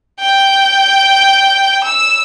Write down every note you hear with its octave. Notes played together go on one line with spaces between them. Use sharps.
G5
E6